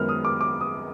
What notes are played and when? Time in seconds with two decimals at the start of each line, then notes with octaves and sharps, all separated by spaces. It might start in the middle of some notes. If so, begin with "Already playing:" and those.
Already playing: F#2 D#3 G#3 B3 F6
0.09 D#6
0.25 D6
0.41 D6
0.61 D#6